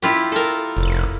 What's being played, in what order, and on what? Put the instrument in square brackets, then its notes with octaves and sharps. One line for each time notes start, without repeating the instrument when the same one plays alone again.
[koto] E4 F4 G4
A4 A#4
[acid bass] F1